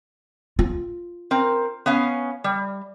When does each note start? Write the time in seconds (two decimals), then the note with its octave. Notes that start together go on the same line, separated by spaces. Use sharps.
0.59 F4
1.31 C4 A#4
1.86 B3 C#4 F5
2.44 G3